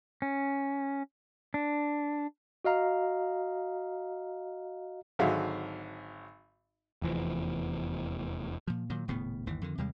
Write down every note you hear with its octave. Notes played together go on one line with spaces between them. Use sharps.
C#4
D4
F#4 D#5 F5 A#5
G#1 D3 F#3 G#4 E5 F5
F1 E2 E3 F3
A#2 F3
A#2 D#3 F#3
D#1 A2 C#3 B3
G1 D#2 E3
F2 D3 D#3
D#2 C3 G3 G#3